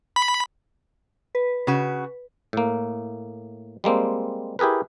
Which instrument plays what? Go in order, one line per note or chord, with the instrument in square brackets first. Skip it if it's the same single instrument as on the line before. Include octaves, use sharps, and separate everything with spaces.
[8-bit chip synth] B5
[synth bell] B4
[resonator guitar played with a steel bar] C#3 F#4
[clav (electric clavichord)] A2 A#3
G3 G#3 A#3 C4
E4 G4 G#4 A#4 B4